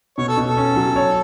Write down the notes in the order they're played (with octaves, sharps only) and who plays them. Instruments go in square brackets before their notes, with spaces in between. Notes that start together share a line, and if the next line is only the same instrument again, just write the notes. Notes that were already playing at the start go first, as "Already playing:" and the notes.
[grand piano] B2 [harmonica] C#5
[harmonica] A4
[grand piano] B2
[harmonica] A4
[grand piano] C#4
F#3
C#5